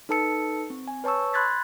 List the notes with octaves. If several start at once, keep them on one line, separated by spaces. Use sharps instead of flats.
D#4 A4 B4 A5 E6 C#7
C4
G#5
B4 C#5 A5 C#6 E6
B5 C6 F#6 G#6 A6 B6